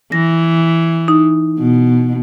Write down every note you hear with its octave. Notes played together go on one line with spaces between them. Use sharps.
E3 A#6
D#4
B2